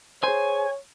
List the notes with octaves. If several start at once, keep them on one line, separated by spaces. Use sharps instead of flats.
G#4 C5 C#5 G#5